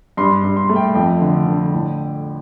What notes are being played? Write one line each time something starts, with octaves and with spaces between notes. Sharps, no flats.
G2 C6
G2
C6
A3
G5
F2 G5
D3
D3
A2